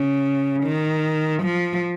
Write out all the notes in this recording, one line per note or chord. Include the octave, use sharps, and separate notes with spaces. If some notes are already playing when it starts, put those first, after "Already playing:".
Already playing: C#3
D#3
F3